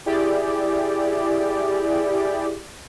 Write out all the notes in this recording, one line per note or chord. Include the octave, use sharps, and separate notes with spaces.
E4 G4 G#4 D5